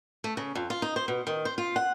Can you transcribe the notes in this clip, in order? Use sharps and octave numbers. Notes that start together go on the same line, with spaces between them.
A3
C#3
F2
F4
D#4
C5
B2
D#3
C5
F4
F#5